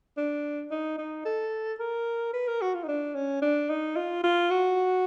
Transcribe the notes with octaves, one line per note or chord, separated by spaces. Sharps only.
D4
D#4
D#4
A4
A#4
B4
A#4
F#4
F4
D#4
D4
C#4
D4
D#4
F4
F4
F#4